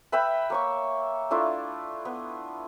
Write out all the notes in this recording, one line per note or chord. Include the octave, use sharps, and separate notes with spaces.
B4 E5 G5 B5
A#3 C#5 C#6
A3 D4 E4 F4
B3